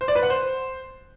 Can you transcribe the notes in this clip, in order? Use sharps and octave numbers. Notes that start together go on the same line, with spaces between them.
C5
D5
B4
F#5
C5